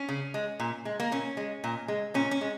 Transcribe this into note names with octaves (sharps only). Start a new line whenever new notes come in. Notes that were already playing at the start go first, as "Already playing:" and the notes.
Already playing: C#4
C#3
G#3
A#2
G#3
A#3
A#2 C#4
G#3
A#2
G#3
A#2 C#4
C#4
G#3